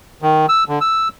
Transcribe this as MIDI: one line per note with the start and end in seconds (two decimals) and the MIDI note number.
0.22 0.46 51
0.49 0.64 88
0.69 0.79 50
0.81 1.08 88